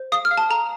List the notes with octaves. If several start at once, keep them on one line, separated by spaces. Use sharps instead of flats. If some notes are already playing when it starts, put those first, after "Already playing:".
Already playing: C5
F5 D#6
F6
F5
A5
A4 A#5